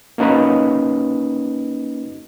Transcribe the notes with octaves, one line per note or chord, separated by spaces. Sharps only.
A#3 C#4 D#4 F#4 B4 D#5